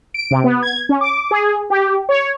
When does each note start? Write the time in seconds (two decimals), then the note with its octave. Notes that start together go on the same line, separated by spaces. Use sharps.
0.14 D7
0.31 C3
0.44 B3
0.63 G#6
0.89 C#4
1.01 D6
1.31 G#4
1.70 G4
2.09 C#5